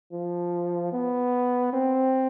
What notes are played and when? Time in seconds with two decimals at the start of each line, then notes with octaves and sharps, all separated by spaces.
0.12 F3
0.92 B3
1.73 C4